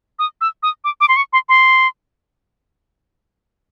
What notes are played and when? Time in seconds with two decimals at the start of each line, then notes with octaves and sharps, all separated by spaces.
0.19 D#6
0.41 E6
0.63 D#6
0.84 D6
1.01 D6
1.09 C6
1.16 C#6
1.33 C6
1.49 C6